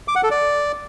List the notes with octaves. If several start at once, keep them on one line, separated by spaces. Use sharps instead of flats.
D6
F#5
A4
D5